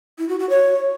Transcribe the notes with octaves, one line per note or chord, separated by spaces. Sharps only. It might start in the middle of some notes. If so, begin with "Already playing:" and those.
E4
F#4
F#4
C#5